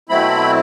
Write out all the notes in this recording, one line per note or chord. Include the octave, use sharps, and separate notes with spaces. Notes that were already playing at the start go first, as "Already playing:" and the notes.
B2 F#3 A3 C4 E4 B5